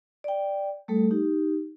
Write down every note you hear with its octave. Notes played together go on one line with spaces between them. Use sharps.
D5 G5
G3 A3 A4
D#4 G4